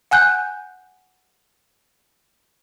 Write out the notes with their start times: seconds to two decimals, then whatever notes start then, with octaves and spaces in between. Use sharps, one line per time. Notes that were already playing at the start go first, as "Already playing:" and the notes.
0.11 F#5 G#5 F#6 G6